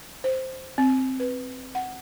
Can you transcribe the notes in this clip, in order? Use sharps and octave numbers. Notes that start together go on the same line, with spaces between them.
C5
C4
B4
F#5